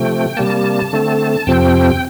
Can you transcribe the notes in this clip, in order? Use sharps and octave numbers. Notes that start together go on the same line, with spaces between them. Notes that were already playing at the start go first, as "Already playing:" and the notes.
Already playing: C3 F3 A3 G5
C3 G3 A#3 A5
D3 A3 C4
F2 C3 F3 C4 G5